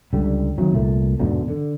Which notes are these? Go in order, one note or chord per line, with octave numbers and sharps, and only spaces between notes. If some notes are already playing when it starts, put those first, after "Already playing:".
C#2 D3 G3
D#3 F#3 C4
C2 A#2 A3
E2 G#2 B2 D3
D3